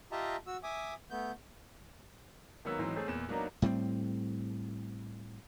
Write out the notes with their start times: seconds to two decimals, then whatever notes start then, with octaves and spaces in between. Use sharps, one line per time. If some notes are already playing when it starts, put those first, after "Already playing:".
0.12 F4 G4 D#5 E5 A5 A#5
0.47 F#4 E6
0.63 E5 G#5 D6 D#6
1.11 A3 B3 G6
2.65 D#3 F#3 A#3 B3 C#5 E6
2.79 G#2 E3 F#3 C4 D#4
2.96 A3 C4 C#4 G#4
3.08 E2 A#2 E7
3.29 F#3 A#3 B3 D4 D#4
3.62 A2 G3 A3 C4